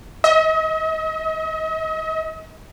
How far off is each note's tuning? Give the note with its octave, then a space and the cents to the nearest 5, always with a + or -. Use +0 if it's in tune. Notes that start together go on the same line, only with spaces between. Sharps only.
D#5 +45